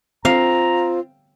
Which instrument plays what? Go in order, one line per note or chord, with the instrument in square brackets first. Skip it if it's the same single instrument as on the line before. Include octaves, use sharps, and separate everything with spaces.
[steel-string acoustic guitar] C4 [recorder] F4 [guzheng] F5 [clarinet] A#5